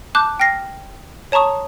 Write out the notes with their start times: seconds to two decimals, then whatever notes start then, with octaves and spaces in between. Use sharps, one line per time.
0.15 A5 D6 F#6 G6
0.40 G5 F6 A#6 C7
1.32 C#5 A5 A#5 C#6 D#6